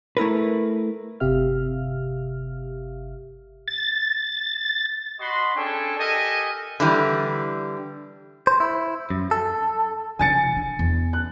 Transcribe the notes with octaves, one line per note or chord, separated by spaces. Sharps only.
A3 E4 A#4 B4
G1 C3 G4 E5 F5 F6
A6
F#4 D#5 B5 C6
C#4 D4 G#4 A4 C#5 G5
G4 A4 A#4 D#5 E5 G#5
D3 E3 G3
C5
E4
F#2
A4
C#3 F3 G#5 A6 C#7
E3 D4
E2
F#6